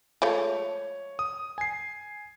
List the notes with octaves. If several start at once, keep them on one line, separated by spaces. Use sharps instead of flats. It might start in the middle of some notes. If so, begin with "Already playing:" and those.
F3 G#3 A3 C#5
D#6
G#5 C7